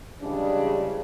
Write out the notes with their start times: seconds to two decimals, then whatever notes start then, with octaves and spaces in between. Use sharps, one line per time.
0.21 C#3 E3 G3 G#3 D4